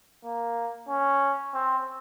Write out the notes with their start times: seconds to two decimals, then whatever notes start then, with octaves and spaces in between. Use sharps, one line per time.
0.24 A#3
0.89 C#4
1.54 C4